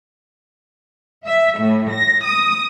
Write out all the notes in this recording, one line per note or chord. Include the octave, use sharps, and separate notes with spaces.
E5
A2
A#6
D#6